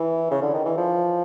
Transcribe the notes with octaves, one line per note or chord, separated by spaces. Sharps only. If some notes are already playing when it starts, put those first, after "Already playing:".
Already playing: E3
C#3
D3
D#3
E3
F3